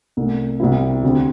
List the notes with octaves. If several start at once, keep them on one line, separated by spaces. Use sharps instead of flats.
C2 C3 A3
C2 C3 G3 C4 E4
D2 D3 C4 G4